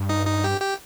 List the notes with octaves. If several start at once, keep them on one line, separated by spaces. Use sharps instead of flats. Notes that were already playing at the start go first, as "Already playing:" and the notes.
Already playing: G2
D#4 D#5
D#4 D#5
G4 G5
G4 G5